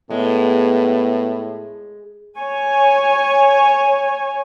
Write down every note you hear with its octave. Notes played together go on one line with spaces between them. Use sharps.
A2 G#3 B3
C#5 G#5